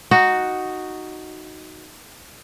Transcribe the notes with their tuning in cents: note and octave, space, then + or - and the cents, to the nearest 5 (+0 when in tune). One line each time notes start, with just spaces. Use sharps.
D#4 +0 F#4 +0